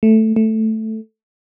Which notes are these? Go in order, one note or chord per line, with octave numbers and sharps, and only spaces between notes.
A3
A3